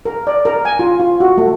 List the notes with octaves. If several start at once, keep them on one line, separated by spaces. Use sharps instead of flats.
A#4
D5
A#4
G#5
F4
F4
F#4
A3